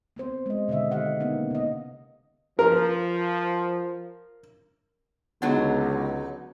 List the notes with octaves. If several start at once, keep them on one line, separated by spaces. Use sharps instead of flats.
B3 C4 C5
G#3 D#5
B2 D3 D#3 D#5 E5
G4 D#5 F5 F#5
A#3 B3 C#4 D#4
C3 D#5
F3 A#4
C#2 D3 F#3 B3 D#4